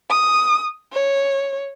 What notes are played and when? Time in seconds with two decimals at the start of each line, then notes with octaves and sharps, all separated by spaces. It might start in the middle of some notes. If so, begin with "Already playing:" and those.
0.10 D#6
0.93 C#5